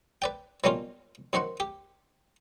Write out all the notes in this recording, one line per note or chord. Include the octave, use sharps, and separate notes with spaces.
B4 D5 G5
B2 F#3 G3 A#3 C#4 F4
F#2 D#3 F#4 C5 F#5
G4